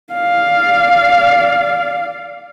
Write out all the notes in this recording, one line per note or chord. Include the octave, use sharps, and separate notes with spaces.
D5 F5